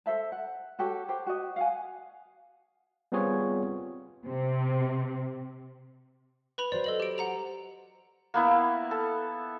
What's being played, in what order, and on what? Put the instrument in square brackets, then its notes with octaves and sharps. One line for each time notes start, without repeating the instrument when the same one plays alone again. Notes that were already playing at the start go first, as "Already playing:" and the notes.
[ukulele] A4 C5 E5 A5
F#5
F#4 G4 A4 C#5
G4 C5
F#4 D#5
F5 F#5 G#5
[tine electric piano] G3 B3 C4 F4 G#4 C#5
[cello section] C3 C4
[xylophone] B4 B5 F7
[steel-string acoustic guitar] F#3 C5 [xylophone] D5
[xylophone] A4 D#5 F#7
G4 D7
F#5 A#5 F7
[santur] A#3 B3 E4
A4